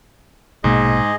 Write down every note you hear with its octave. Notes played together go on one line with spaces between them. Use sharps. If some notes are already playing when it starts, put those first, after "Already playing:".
A#1 G#2 B2 A#3 G#4 D#5